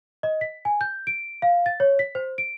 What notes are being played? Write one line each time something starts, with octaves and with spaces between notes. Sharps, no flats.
D#5
B6
G#5
G6
D7
F5
A6
C#5
B6
C5
D7